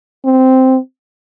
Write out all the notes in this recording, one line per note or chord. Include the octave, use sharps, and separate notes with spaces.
C4